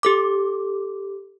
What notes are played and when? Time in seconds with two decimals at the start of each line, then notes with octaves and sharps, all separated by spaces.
0.03 G4 A4 D6